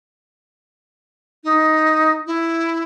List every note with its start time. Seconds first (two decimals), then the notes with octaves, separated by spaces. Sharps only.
1.44 D#4
2.27 E4